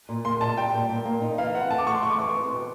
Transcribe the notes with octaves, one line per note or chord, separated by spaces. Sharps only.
A#2
A#3 C6
A#2 A5
G3 G5
A#2
A#2
A#3
D#4
E3 F5
C4 F#5
A3 A5
D6
A3 C#6
C6
E3 C#6
D6
E3 C#6
C4
B2